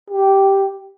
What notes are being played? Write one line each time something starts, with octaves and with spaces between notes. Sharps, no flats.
G4